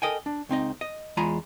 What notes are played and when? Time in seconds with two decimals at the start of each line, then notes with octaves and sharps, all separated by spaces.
0.02 A4 A#4 D#5 G5 G#5
0.26 D4
0.49 C#2 C4 D#4 D#5
0.81 D#5
1.17 E2 G#3 F4 G#5 A#5 B5